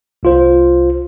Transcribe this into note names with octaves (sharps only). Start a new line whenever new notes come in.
C2 F4 C5